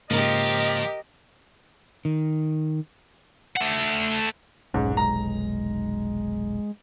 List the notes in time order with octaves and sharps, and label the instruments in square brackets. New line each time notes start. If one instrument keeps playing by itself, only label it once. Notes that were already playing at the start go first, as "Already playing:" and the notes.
[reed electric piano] G#2 C#3 A#3 [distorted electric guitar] F3 [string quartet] G4 A#4 [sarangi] D#5
[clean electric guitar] D#3
[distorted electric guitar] A3 F#5
[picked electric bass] F1 B1 [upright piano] G#2 [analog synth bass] C#4
[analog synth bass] G#3 [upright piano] A#5